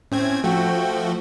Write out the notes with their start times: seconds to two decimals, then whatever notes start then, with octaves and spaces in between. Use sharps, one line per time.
0.12 A2 C4 C#4 G#6
0.44 F3 A3 F#4 G5